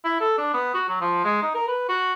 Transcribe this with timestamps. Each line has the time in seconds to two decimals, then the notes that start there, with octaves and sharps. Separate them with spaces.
0.04 E4
0.21 A4
0.38 D4
0.54 B3
0.74 F#4
0.88 F#3
1.01 F3
1.24 G#3
1.42 D#4
1.55 A#4
1.68 B4
1.89 F#4